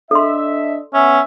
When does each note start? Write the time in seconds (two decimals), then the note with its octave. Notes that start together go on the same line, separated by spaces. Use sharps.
0.11 D4 A4 D#5 E5 C6
0.94 B3 C#4 E5